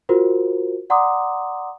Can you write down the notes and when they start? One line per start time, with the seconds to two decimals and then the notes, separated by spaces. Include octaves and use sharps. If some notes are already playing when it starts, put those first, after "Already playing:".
0.09 F4 F#4 A#4 C5
0.90 D5 F#5 A#5 C6 D6 D#6